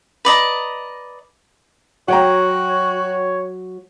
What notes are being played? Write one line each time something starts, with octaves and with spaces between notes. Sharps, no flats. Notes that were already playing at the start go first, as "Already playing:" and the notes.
B4 D5 D#5 A#5
F#3 F#4 C#5 F#5 G5 A#5
C#5